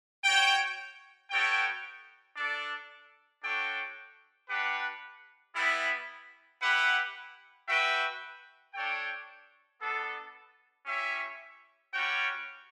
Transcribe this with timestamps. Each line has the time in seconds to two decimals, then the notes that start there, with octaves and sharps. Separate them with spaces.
0.24 F#4 C#5 G5
1.30 B3 F#4 A4 C#5 G5
2.36 D4 A4 D5
3.42 D4 F#4 A4 C#5 G5
4.49 G3 D4 G4 B4 F#5
5.55 G3 B3 E4
6.61 E4 G4 B4 F#5
7.68 F#4 B4 E5 G5
8.74 D4 A4 C#5 G5
9.80 B3 D4 A4
10.86 C#4 E4 G4 C#5 E5
11.93 G3 C#4 F#4 C#5 G5